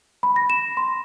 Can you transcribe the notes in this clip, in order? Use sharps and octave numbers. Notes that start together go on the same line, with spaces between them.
B5
A#6
E7
C6